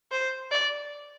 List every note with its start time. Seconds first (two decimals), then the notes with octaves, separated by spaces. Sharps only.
0.12 C5
0.51 D5